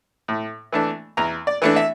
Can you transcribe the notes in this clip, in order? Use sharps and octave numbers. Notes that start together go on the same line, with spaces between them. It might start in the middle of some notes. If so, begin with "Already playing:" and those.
A2
E3 A3 D4
E2 A#5
D5
E3 A3 D4
E5